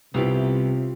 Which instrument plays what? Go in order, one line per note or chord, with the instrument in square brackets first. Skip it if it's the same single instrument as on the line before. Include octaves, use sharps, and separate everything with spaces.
[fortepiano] C2 B3 E4 [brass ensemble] C3 [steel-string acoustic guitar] F4 G4 G5